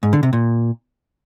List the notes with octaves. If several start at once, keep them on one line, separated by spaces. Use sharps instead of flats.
G#2
D3
C3
A#2